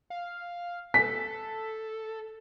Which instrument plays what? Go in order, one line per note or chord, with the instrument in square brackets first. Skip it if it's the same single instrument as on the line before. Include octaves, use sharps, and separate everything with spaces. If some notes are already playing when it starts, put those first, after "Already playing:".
[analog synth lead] F5
[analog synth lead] A4 [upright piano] B6